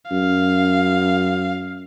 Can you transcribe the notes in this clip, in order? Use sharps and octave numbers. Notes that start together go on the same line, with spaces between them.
F#2 F5